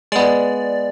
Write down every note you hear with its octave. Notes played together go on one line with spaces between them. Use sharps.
G#3 B3 D5